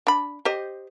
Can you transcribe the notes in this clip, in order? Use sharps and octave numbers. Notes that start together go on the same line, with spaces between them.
D4 B5
G4 C5 D#5